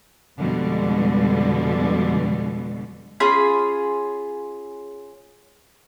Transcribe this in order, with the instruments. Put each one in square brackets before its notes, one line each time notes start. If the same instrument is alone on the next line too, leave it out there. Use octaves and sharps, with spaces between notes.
[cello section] F2 B2 D3 G3 G#3
[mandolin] C#4 F4 G#4 B5